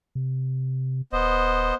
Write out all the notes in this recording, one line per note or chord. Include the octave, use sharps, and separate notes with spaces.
C3
D#1 B3 C5 D#5